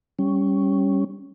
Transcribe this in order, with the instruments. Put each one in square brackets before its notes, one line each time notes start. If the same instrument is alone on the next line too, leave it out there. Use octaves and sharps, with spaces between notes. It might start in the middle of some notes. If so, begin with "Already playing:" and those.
[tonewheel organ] G3 C#4